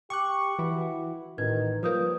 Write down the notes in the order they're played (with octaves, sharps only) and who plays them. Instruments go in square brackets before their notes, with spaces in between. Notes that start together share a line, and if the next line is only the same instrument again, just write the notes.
[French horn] G4 [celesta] G5 D6 [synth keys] C#6 F#6
[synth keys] E3 E4 [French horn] F#4
[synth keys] A1 [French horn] D#3 [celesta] B4 G#6
[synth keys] F3 A#3 [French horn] G3 [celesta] B4 D#6 G6